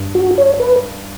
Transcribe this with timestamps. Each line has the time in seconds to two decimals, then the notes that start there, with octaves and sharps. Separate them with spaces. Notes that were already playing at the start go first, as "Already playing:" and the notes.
Already playing: G2
0.15 F#4
0.38 C#5
0.60 B4